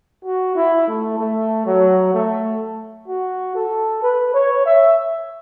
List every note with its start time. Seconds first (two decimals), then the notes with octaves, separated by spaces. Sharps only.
0.25 F#4
0.56 E4
0.88 A3
1.19 A3
1.66 F#3
2.14 A3
3.08 F#4
3.55 A4
4.03 B4
4.34 C#5
4.66 E5